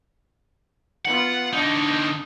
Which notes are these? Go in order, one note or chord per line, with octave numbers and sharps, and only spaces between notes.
B3 F4 F#5
D3 D4 D#4